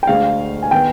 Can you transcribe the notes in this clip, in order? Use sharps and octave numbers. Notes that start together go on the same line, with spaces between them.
G5
D2 D3 G#3 F5
G#5
D#3 B3 G5